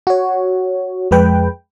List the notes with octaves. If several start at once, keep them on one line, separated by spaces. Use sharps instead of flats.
F#4 C#5
F2 G#3 B4 G5